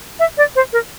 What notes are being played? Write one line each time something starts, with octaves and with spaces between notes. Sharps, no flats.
E5
D5
C5
A#4